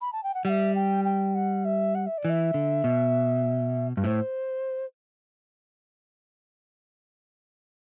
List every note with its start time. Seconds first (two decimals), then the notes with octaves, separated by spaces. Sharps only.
0.01 B5
0.12 A5
0.23 G5
0.34 F#5
0.45 G3 E5 F#5
0.75 G5
1.04 G5
1.34 F#5
1.64 E5
1.94 F#5
2.06 E5
2.17 D5
2.25 E3 E5
2.54 D3
2.84 B2
3.97 G2
4.04 A2 C5